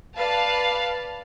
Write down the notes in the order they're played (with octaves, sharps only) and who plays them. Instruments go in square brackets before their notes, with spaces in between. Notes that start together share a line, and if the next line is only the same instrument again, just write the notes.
[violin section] B4 D5 F5 A5